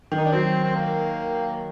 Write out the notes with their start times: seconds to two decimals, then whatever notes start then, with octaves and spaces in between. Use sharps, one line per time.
0.12 D#3
0.18 D#4
0.25 D4
0.32 F#3 C4
0.64 C4
0.75 A#3